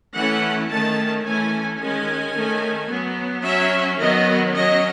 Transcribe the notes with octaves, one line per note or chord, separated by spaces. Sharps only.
E3 A3 C#4 F#5
D#3 A3 C#4 A5
E3 A3 C#4 G#5
D#3 G#3 C#4 G#5
D#3 A3 C#4
F#3 B3
F#3 C#4 E5
D#3 F#3 B3 D#5
F#3 C#4 D#5